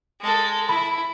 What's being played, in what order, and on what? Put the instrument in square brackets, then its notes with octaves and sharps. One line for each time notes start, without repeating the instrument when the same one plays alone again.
[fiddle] G#3 A4
[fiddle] E4 [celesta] B5